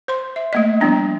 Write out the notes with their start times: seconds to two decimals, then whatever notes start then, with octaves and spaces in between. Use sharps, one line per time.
0.08 C5 C6
0.36 E5
0.53 A3 A#3 D#5
0.80 F3 G3 B3 D4 E4